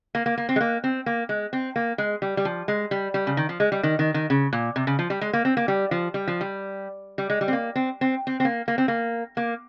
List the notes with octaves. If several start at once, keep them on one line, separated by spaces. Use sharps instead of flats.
A#3
A#3
A#3
C4
G#3
A#3
C4
A#3
G#3
C4
A#3
G#3
G3
G3
F3
G#3
G3
G3
C#3
D#3
F3
G#3
G3
D#3
D#3
D#3
C#3
A#2
C3
C#3
F3
G3
G#3
A#3
C4
A#3
G3
F3
G3
F3
G3
G3
G#3
G3
C4
A#3
C4
C4
C4
C4
A#3
A#3
C4
A#3
A#3